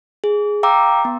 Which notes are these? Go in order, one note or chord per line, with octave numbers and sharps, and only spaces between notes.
G#4
F5 G5 A#5 D6 E6
B3